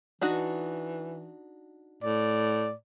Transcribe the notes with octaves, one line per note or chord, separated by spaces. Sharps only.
E3 D4 D#4 F#4
A2 D5